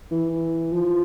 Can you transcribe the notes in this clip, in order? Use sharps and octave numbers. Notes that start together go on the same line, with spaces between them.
E3
F3